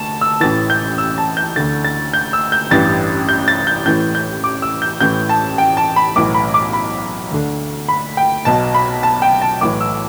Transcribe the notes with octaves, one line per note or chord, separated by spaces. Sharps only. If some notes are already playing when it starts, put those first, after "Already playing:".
Already playing: D2 A5
E6
A1 A2 E3 A6
G6
E6
A5
G6
D2 D3 A6
A6
G6
E6
G6
A1 G2 E3 A6
G6
A6
G6
A1 A2 E3 G6
G6
D6
E6
G6
A1 A2 E3 G6
A5
G5
A5
B5
B1 A2 E3 D6
B5
D6
B5
D2 D3
B5
G5
B1 B2 A5
B5
A5
G5
A5
B1 A2 E3 D6
E6